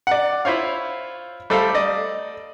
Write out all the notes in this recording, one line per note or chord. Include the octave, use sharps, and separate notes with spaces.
D5 F#5
E4 F4 C5 C#5 F5
G3 A3 A4 C5 F5
D5 D#5